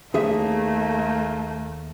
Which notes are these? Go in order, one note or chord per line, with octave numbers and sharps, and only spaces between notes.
D#2 A3 A#3 G#4 E5